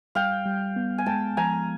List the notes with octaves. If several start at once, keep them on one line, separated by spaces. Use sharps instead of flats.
G3 F5 G5
G3
B3
G#5
G#3 G5 A5
F3 G#5 A#5